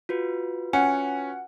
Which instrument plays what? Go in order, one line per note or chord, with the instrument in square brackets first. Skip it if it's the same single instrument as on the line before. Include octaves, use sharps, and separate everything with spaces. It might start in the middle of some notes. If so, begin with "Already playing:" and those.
[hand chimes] F4 F#4 B4
[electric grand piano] C#4 [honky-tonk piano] F#5 [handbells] G#5